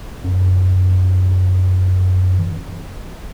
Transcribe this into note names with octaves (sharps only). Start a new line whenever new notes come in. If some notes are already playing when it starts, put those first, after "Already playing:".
F#2
E3